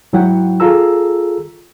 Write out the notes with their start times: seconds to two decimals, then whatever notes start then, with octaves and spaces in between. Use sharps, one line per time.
0.13 G#2 F#3 E4 F#4 F#5 G5
0.60 F4 G#4 A4 A#5 E6